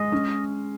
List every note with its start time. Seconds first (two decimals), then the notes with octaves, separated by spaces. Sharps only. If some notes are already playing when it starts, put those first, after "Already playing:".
Already playing: G#3 D#5
0.12 C#4